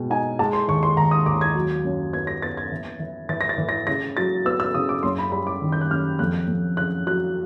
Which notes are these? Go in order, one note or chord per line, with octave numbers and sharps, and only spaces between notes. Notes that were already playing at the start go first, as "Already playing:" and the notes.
Already playing: B2 G#3 G5
D#4 G#5
G#3 A5
C6
D#2 C#6
C6
D#2 A#5
D#6
D#2 D6
G#6
F#3
F#2
B3 G#6
A#6
B3 A6
G#6
E3
E3
E3 A6
A#6
A6
E3
A#6
C#3 A#6
F#3 A6
B3 E6
E6
C#3 D#6
D6
F#2 C6
B5
G3 B5
D6
D#3
G6
F#6
F#2 F6
F2 F#6
F2
C#3 F#6
F#3 F#6